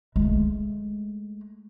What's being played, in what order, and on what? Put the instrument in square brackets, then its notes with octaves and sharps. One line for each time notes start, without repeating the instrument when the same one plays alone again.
[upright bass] G#3 A3